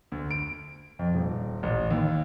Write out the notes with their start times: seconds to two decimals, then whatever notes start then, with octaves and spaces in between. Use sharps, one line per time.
0.12 D2
0.31 D7
0.99 F2
1.15 D#1
1.63 A1
1.91 D#2